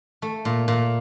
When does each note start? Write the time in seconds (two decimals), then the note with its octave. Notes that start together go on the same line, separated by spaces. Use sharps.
0.22 A3
0.45 A#2
0.68 A#2